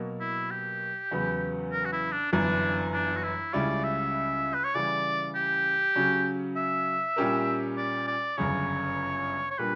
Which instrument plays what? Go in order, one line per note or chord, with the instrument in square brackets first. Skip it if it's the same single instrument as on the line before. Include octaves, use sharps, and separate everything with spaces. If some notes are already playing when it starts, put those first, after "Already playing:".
Already playing: [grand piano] B2 F#3 A#3
[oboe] E4
G4
[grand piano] E2 C#3 F#3 B3
[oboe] A#4
F#4
E4
D4
[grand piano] G1 F#2 E3 B3 [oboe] D4
[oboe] D4
F#4
E4
[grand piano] C#2 C#3 G3 C#4 E4 [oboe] D5
[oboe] E5
B4
C#5
[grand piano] C#3 E3 G3 [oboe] D5
[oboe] G4
[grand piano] C#3 F#3 C#4 F#4
[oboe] E5
[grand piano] A#2 G3 C#4 G4 A#4
[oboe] D5
D5
[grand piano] G1 F#2 C#3 [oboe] C#5
[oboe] C#5
[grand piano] A#2 G3 A#3 D4 [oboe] B4